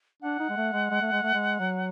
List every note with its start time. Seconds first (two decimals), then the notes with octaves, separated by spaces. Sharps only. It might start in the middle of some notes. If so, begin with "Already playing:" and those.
0.22 D4 F#5
0.40 D#4
0.50 G#3
0.57 A3
0.73 G#3
0.91 G#3
1.02 A3
1.12 G#3
1.23 A3
1.34 G#3
1.59 F#3